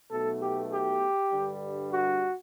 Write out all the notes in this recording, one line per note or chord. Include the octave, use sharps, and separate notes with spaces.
B1 B2 A3 A4
G4
G4
G2 D3 G3
F#4